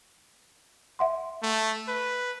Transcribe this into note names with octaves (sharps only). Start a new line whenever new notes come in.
E5 F#5 C6
A3
B4